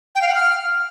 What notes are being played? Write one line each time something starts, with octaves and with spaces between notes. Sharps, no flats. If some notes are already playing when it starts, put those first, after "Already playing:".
G5
F5
F#5
F6